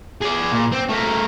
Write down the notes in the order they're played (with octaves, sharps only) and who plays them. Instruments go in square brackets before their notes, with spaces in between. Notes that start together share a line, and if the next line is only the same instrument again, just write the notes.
[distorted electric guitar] G#4 D5
A#2
C4
A3 A#4